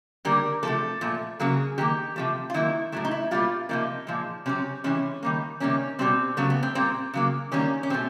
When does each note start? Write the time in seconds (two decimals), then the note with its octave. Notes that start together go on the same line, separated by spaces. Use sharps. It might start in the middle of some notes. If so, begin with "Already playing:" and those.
0.25 D3 G3 A#3 A#4
0.63 C3 F3 A3 A4
1.01 A#2 F3 A3
1.39 C#3 F#3 A#3 G#4
1.78 D#3 F#3 A#3 G4
2.16 C3 F3 A3
2.50 F4
2.54 D#3 F#3 A#3 E4
2.92 A2 F#3 A3 E4
3.05 D#4
3.11 E4
3.31 B2 G3 A#3 F4
3.69 C3 F3 A#3 D#4
4.07 A#2 F3 G#3
4.46 C3 D#3 F#3 C#4
4.84 C3 E3 G#3 C#4
5.23 D#3 G3 A#3
5.60 C3 D#3 G3 A#3 C#4
5.99 B2 G3 A#3 C4
6.37 C#3 F#3 A3 B3
6.50 B3
6.63 C4
6.75 A#2 G3 A#3 C4
7.14 C#3 F#3 A#3
7.52 D#3 G3 A#3 C#4
7.83 C#4
7.90 B2 F#3 A3 C4